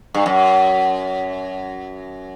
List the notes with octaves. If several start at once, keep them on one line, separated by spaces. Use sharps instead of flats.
G2
F#2